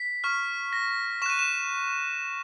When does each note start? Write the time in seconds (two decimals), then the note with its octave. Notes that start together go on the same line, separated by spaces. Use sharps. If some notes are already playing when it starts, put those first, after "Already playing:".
Already playing: B6
0.24 C#6 F6
0.73 A#6
1.22 C#6 E7
1.26 F#6 D#7
1.39 E7